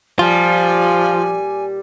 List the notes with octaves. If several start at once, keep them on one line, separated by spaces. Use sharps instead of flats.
A#2 F3 G3 F4 G#5